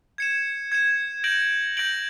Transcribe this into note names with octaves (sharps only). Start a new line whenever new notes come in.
G#6 C#7 E7
G#6 C#7 E7
G6 A#6 D7 F#7
G6 A#6 D7 F#7